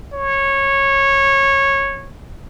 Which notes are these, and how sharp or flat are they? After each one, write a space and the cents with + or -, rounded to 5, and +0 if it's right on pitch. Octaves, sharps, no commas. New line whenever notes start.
C#5 -15